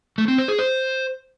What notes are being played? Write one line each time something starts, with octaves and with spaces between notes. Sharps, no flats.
A3
C4
C5
G#4
C5